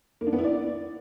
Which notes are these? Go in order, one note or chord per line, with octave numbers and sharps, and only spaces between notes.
A#3
D4
B3
E4
D5